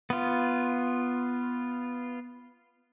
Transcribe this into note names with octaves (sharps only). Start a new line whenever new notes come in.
B3 F4